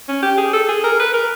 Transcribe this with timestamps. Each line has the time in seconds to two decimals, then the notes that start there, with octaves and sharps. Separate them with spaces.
0.08 C#4
0.22 G4
0.38 G#4
0.53 A4
0.68 G#4
0.84 A#4
0.99 B4
1.14 A#4